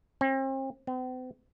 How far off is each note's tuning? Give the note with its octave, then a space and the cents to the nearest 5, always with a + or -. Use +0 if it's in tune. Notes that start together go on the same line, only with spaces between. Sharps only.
C4 +40
C4 -45